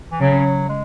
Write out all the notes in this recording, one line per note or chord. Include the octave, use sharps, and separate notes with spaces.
E3
C#3 F#3
G#3